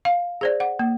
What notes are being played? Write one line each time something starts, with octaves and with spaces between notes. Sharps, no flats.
F5
G#4 C5 D5
F#5
A#3